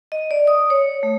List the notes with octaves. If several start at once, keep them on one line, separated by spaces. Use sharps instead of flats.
D#5
D5
D#6
C#5
A3